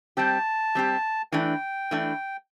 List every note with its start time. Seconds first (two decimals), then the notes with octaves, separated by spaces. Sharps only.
0.17 G3 C4 G4 A5
0.75 G3 C4 G4
1.32 E3 A3 D4 G5
1.91 E3 A3 D4